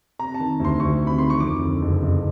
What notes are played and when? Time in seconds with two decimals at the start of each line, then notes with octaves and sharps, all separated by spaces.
0.19 C3 A#5
0.34 A5
0.40 D#3
0.60 D2 C6
0.80 D2 C#6
1.00 C3
1.07 B5
1.18 D#3 C6
1.30 C#6
1.40 F2 D6
1.62 D3
1.82 F#1
2.02 F#1